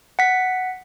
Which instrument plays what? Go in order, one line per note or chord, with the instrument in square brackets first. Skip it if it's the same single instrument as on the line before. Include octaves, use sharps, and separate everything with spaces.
[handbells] F#5 B6